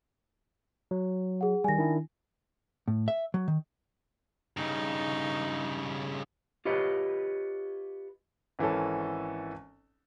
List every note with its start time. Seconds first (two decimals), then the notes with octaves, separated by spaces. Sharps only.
0.91 F#3
1.41 G#4 F#5
1.64 D#3 G3 G#5 A#6
1.79 D#3 D4 E4
2.88 A2
3.08 E5
3.34 F#3
3.48 D#3
4.57 G2 C#3 D#4
6.65 F4 G4 B4 C#5 D#5
8.59 G#1 E3 C#4 A4